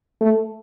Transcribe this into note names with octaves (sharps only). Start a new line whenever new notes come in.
A3